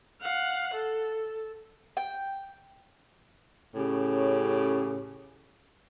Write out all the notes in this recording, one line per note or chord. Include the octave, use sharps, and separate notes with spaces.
F5 F#5
A4
G5
A2 C#3 C#4 G4